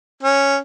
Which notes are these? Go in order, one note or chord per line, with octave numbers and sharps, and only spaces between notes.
C#4